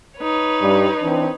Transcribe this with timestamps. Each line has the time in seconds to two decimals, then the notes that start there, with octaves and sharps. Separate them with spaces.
0.18 D#4 B4 C#5
0.61 G2 G3
1.02 E3 C4 D4